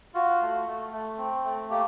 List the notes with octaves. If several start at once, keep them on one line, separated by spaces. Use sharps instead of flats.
F4 F#4
A3
A3
A3
C4
A3
A#3 G4